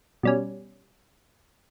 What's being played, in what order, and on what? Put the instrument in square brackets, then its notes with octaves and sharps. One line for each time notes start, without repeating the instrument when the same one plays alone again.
[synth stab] B2 G3 C#4